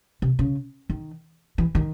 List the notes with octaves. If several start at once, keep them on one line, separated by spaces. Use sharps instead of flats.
C3
C#3
D#3
E3
D#3